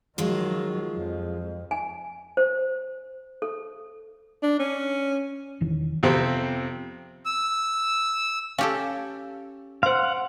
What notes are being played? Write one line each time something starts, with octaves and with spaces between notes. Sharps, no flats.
D#3 F3 F#3 G#3 F4
F2
G#5
C5
A4
D4
C#4
E1 D#3 E3
F2 C3 B3 C4
E6
C#4 G4 A4 F5
C5 F5 F#5 C6